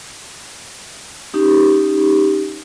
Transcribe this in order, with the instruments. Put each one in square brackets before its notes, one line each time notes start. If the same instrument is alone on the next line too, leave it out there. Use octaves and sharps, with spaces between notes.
[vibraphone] C#4 D#4 G4